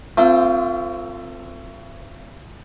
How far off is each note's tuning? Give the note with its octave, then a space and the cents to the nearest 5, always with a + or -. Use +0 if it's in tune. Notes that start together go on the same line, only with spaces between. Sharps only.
A3 +35 C4 -10 F4 +0